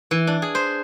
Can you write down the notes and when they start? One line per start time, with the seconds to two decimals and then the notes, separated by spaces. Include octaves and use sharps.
0.11 E3
0.27 D4
0.42 G#4
0.55 C5